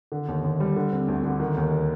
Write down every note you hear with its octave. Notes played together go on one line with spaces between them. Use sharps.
D3
D#2
D#2
G3
D3
C4
D2
D3
D#3
D#2